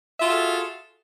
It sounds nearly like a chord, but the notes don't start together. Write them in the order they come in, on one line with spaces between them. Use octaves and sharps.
E5 F4 F#4 G#4 A4